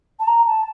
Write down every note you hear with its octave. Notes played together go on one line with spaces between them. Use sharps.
A5
A#5
A5